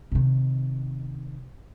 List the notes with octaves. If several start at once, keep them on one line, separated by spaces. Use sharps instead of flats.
C3 D#3